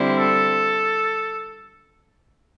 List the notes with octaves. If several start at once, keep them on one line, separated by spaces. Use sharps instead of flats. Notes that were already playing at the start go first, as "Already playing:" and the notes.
Already playing: D3 G3 C4 E4
A4